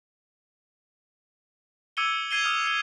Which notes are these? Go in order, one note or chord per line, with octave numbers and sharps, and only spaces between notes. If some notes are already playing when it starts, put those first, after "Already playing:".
D6 E6 G#6 C#7 D#7 G7
G#6 C7 D#7 G7
D#6 F6 F7
C#7 G7